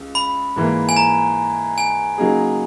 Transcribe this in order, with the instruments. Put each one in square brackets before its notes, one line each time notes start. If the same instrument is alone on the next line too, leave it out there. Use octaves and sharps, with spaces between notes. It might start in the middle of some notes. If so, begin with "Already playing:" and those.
Already playing: [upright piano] C#2
[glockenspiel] B5
[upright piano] G#2 E3 A#3
[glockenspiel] G#5
A#5
G#5
[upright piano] C#3 F#3 A#3 D#4 G#4